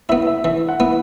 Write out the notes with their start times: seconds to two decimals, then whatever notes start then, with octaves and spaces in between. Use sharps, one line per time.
0.09 B3 E4 E5
0.27 E5
0.44 E3 E5
0.68 F#5
0.80 B3 E4